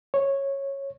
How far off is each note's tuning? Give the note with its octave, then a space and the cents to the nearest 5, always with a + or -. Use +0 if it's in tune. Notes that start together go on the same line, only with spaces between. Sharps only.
C#5 -10